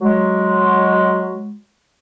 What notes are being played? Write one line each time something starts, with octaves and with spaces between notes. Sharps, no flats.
F#3 G#3